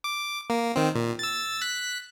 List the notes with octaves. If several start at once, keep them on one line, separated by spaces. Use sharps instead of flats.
D6
A#3
D#3 C4
A#2
E6 A6
F#6 B6